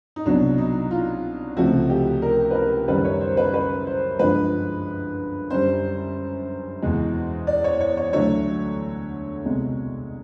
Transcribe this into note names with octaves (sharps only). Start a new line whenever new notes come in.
D#4
C2 B2 F#3 D4
D#4
F4
C#2 C3 F3 A3 F#4
G4
A#4
B4
A#4
F#2 D#3 G3 B4
C#5
C5
B4
B4
C5
G2 D3 F3 G#3 B4
F#2 D3 G3 C5
E2 B2 G#3
D5
C#5
C#5
C#5
D2 D3 F#3 A3 C#5
C2 B2 G#3